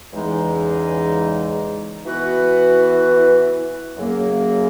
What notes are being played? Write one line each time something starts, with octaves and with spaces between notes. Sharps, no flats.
E2 C#3 E3 G#3 D#4
E3 B3 F#4 B4
F#2 C#3 F#3 A#3 C#4